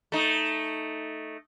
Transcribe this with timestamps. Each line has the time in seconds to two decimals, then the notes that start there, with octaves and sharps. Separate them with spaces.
0.12 A3 D#4